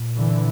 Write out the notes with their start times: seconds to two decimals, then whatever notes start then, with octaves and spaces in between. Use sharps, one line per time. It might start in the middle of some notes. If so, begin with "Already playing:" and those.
Already playing: A#2
0.17 D3 E3